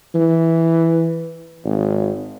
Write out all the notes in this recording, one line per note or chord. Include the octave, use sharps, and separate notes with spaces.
E3
G#1